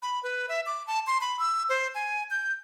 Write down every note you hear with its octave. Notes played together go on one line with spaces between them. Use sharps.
B5
B4
E5
D6
A5
C6
B5
E6
C5
G#5
G6